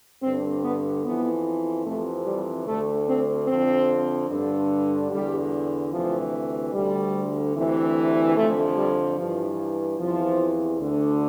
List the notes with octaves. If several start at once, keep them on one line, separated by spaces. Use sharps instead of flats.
G2 D3 C4
B3
F2 E3 B3
F2 C3 E3 A3
G3
D2 D3 A3
C4
F2 C4
D3
G2 D3
E2 D3 G3
D2 C3 E3 F3
D2 D3 G3
D2 C3 E3
F2 D3 A3
G3
G2 E3 F3
E2 C3 E3 F3
D2 D3